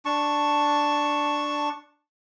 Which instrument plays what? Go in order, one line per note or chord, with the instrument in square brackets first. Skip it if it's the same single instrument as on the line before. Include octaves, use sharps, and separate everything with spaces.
[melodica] D4 A5 C#6